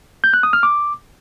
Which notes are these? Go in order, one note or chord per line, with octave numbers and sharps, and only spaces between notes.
G6
F#6
D#6
F6
D6